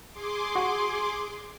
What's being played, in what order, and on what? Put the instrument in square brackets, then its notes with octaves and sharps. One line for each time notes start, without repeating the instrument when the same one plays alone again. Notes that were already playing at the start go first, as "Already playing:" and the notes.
[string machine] G#4 C6 D6
[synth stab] F#4